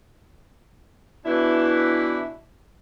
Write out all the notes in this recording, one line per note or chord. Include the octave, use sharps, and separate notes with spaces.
B2 E3 D4 E4